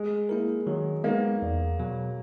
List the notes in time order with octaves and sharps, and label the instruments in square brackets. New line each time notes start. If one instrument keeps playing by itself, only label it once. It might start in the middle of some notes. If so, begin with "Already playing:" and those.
Already playing: [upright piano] G#3
[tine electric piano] A#3 E4 A#4
[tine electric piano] D#3 [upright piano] F#3
[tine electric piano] G#3 B3 D#4 [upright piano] A#3
[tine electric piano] E2
B2 F#3